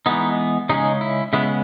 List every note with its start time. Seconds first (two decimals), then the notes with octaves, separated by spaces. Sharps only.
0.06 E3 G#3 B3 D#4
0.69 C#3 G#3 C#4 D#4
1.01 E4
1.33 C#3 G#3 B3 E4